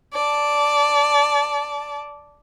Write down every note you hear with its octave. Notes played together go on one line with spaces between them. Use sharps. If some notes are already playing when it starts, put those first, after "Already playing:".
D5 A5